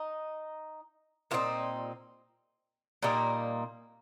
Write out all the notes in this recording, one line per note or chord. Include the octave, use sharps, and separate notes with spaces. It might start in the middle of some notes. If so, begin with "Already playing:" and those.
Already playing: D#4
A#2 G3 C4 D#4 F4
A#2 G3 A#3 D#4